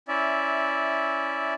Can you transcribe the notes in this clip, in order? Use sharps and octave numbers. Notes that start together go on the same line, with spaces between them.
C#4 E4 D5 E5